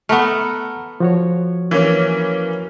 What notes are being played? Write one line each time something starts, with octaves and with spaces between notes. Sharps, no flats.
A3 B3 F#5 A#5 F6
F3 F#4 C#5
E3 A#3 C#4